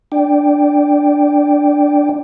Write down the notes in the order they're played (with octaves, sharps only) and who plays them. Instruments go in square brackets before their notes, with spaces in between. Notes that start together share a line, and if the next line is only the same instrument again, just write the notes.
[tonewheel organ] D4 D5 G5